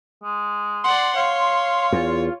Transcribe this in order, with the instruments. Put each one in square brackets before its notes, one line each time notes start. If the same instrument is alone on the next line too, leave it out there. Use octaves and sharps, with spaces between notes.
[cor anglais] G#3
[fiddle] D5 F#5 [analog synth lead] C6
[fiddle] C#5 [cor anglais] F5
[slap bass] E2 [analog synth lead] F4